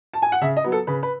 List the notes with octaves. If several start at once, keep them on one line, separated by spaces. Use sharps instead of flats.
A5
G#5
F#5
C#3 E5
D#5
F#3 B3
A4
C#3 B4
B4